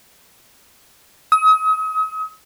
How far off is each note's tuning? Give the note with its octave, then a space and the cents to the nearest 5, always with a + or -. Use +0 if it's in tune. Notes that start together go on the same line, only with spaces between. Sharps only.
D#6 +40